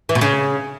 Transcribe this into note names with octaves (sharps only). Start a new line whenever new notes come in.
E3
B2
C#3